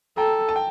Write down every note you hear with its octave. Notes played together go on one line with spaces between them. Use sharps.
A4 G5 A#5
A5
G5